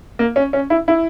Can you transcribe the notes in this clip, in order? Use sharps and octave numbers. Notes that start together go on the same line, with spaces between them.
A#3
C#4
C#4
E4
E4